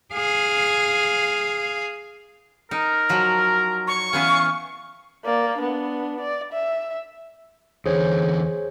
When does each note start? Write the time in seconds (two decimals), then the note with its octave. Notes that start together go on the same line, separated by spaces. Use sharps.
0.13 G#4 F5
2.71 D#4 A#4
3.09 F3 F#3
3.87 C#6
4.13 E3 B3 C#4 F5
5.25 A#3 D5
5.58 B3 D4
6.20 D5
6.52 E5
7.85 E2 D3 E3 G#4 C5 C#5